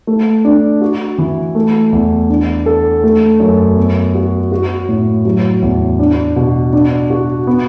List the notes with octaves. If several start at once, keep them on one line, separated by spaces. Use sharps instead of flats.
A3
D4
F#4
E3
A3
E2
D4
A4
A3
F#2
B3
F#4
F#4
A2
F#3
E2
D4
B2
D4
F#4
B3